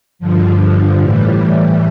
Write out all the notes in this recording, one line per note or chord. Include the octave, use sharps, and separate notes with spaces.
G2 D3 F3
A2 E3 G3